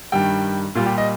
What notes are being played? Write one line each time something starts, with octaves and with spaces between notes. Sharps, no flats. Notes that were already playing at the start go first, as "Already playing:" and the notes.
G2 D#3 G3 G5
A#2 G3 F4
G4
D#5